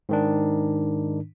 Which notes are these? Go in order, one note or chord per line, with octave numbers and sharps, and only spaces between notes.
G#2 D#3 D4